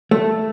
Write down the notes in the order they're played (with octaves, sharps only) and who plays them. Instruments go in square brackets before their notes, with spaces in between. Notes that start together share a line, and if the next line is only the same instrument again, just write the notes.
[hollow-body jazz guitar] A3